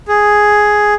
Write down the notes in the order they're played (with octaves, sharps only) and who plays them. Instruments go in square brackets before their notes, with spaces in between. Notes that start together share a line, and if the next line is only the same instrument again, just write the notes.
[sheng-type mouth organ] G#4